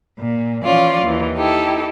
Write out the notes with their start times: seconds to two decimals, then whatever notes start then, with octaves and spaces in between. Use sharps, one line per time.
0.19 A#2
0.63 E3 F3 C#4 F4 D5
1.03 D#2 D#3 E3
1.37 D#4 E4 G4 A4